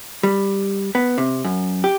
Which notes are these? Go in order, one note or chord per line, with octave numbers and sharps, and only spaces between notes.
G3
B3
C3
F#2
G4